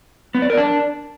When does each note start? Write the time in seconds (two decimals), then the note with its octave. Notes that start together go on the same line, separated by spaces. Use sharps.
0.35 B3
0.42 D5
0.50 A#4
0.57 D4